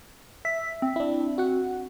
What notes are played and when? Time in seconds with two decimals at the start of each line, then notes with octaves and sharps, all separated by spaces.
0.45 E5 B6
0.82 C4
0.96 D4 E4
1.38 F#4 F#5